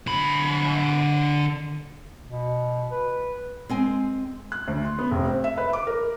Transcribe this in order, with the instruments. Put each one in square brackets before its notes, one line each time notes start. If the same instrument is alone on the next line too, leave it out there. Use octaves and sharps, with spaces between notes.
[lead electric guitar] D3 B5
[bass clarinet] B2
B4
[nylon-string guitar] G#3 C4 G#5
[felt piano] F#6
D2
C6
B3
F1
C4
E5
B4
D6
A#4